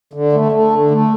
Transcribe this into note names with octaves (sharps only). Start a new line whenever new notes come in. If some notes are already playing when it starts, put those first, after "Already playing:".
D3
A3
A3
D3
A3